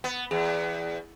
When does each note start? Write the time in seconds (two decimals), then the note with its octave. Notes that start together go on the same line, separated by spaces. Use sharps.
0.04 B3
0.31 E2 G#4